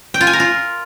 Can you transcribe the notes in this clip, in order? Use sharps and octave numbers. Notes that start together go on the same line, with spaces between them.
G5
F4
G#5
A#4
F4